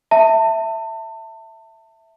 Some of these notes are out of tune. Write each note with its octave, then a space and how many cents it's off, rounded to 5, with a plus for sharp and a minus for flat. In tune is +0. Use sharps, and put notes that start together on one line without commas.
E5 +0 A5 +30